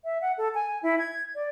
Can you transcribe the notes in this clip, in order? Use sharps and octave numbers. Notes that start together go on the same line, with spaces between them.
E5
F#5
A4
G#5
E4
G#6
D5